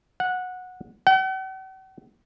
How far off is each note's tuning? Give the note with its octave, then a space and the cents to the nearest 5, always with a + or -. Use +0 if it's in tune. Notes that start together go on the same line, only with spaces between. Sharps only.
F#5 -15
F#5 +45